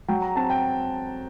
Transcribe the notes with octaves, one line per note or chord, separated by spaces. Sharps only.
F#3 G5
A#5
C4 A5
G5